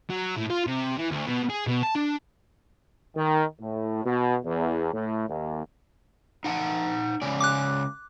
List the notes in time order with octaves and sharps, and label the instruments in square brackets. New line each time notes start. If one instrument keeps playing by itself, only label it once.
[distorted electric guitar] F#3
A2
F4
C3
E3
D2
B2
G#4
B2
A5
D4
[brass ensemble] D#3
A2
B2
E2
A2
D#2
[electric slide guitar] D#4 F#5 A5
C#3 G#3 D5
[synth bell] D6 F#6